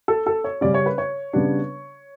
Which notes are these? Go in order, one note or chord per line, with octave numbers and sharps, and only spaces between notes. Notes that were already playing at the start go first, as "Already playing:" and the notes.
A4
A4
C#5
C#3 G3 C#4 D5
C#5
B4
C#5
C#3 G3 B3 D4